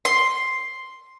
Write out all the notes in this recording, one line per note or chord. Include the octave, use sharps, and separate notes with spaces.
C6